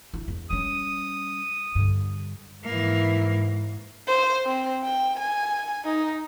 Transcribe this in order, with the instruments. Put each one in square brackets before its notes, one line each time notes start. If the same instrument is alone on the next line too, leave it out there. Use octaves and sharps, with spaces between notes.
[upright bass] E4
E2
[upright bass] G3 C#4 [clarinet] D#6
[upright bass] G2 D3
[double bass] G#2 [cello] E3 A#3
[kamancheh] C5
C4
G5
G#5
D#4